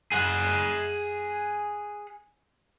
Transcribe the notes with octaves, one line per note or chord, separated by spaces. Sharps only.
G#4 F#5